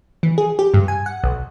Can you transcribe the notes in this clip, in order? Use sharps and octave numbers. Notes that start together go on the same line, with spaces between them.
E3
G#4
G4
G2
G#5
F#5
B1